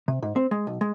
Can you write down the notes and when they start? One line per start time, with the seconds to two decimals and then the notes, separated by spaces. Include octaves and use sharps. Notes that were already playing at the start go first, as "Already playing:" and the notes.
0.08 C3
0.22 G#2
0.36 C4
0.51 G#3
0.67 B1
0.81 G#3